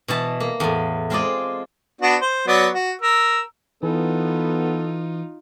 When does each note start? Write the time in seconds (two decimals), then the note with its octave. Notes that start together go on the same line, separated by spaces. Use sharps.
0.08 B2 E3 A5
0.40 A#3
0.60 E2 A2
1.10 G#3 C4 F4 A4 D5 D#5
2.01 B3 D4 F#4
2.21 C5
2.48 F#3 B3 D5
2.74 F#4
3.01 A#4 E6
3.83 E3 B3 D#4 F4 A4